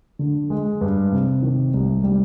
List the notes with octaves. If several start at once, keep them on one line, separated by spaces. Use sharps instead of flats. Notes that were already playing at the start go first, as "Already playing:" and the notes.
D3
G#3
G2
C3
D#3
C2
G3